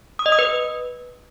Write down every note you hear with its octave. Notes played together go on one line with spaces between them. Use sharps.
D#6
D#5
D#6
B4